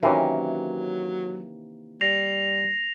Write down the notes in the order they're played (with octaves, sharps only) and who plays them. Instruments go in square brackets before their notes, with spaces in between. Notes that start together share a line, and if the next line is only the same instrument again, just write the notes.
[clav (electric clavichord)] C3 E3 [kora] D#3 A#3 C#4 [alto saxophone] F#3
[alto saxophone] G3 [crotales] A#6 C7 F7